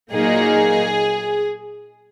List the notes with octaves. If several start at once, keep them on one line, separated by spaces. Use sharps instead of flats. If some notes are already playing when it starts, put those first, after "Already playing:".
A#2 F#3 A#3 D#4 G#4